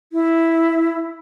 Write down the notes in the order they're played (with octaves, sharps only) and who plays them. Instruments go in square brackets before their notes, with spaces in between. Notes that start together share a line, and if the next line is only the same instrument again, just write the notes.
[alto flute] E4